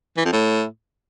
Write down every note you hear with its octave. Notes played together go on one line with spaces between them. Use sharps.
E3
F2
A2